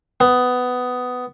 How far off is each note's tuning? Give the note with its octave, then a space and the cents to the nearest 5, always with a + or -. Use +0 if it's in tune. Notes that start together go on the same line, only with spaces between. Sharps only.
B3 +15